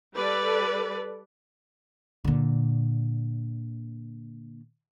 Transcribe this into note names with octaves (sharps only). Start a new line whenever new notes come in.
G3 A4 B4 D5
A#2 D3